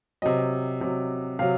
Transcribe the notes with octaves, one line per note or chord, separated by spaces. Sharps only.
C3 F#3 D#5
C3 F#3
C3 F#3 F5